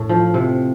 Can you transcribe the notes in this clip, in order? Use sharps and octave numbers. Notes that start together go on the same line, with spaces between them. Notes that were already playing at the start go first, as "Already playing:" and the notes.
Already playing: A2
F3
C3